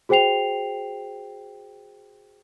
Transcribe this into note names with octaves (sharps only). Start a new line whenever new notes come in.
F#4 G#4 C5 G5 C7 F7